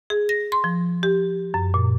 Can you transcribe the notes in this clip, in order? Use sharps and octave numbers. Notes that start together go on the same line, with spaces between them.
G#4
A#6
C6
F3
G4
F#2
A#2